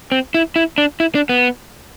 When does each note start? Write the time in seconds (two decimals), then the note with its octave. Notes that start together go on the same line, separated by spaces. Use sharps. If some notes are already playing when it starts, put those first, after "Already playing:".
0.12 C4
0.34 E4
0.56 E4
0.78 D4
1.00 E4
1.15 D4
1.29 B3